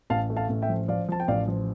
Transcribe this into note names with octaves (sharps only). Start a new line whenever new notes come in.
A1 F5 A5
A3
F5 A5
A1
E5 G5
F3
F3 D5 F5
F3 A5
G5
A1 D5 F5
F3